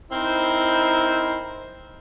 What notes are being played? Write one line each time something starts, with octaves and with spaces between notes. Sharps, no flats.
C4 D#4 E4 A#4 C5